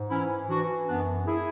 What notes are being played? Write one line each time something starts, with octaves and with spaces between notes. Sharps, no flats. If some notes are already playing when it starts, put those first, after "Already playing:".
Already playing: G#2
E3 C#4 E4
E3 D4 F#4
F#2 B3 D4
E4 G#4